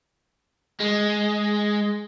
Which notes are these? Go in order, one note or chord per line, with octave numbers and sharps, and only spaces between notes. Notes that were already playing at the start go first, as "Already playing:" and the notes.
G#3